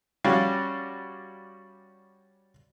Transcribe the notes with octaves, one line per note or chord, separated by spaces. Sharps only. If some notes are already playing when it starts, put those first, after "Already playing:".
G3 C#4 F#4 F5